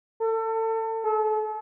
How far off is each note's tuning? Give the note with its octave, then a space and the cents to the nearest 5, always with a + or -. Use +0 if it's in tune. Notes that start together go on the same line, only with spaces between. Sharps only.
A4 +30
A4 -35